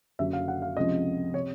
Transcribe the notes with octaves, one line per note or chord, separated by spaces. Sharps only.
F#1 F#2 D3 F#3 E5
F5
F#5
F5
C#2 C3 F3 D#5
C3 C#5